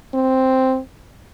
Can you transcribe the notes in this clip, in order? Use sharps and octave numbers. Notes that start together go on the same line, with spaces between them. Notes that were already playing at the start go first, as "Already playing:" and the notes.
C4